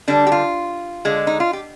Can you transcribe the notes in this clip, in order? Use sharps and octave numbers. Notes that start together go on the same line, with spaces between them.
D3 G3 D4
G4
F4
D3 G#3
D#4
F4
G4